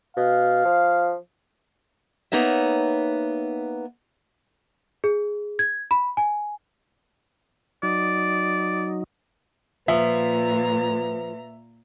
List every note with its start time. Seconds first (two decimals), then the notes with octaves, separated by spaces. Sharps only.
0.16 B2 F5
0.65 F3
2.32 A#3 B3 D#4 C#5 E5
5.04 G#4
5.59 G#6
5.91 B5
6.17 G#5
7.83 F#3 D#4 D5
9.88 A#2 F3 B4 E5 A#5